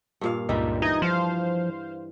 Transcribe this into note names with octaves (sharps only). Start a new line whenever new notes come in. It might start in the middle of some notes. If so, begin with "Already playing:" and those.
G2 A#2 F5
C#2 G2 A#2 G3 D#4 E5
E3 D#4 D#5 G#6
F3 C5 F5